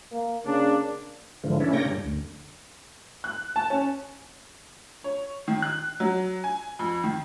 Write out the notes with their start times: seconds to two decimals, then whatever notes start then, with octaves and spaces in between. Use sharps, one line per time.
0.12 A#3
0.45 C#3 A#3 D4
1.44 G#2 D3 E3 F3
1.60 C#4 D4 E4
1.73 C#3 A#3 D4 C#5 G5 A#6
1.85 G2
2.04 D2
3.24 F#6
3.56 A5
3.70 C#4
5.04 C#5
5.48 D#3
5.62 F#6
6.00 F#3
6.44 G#5
6.79 F2
7.04 D#3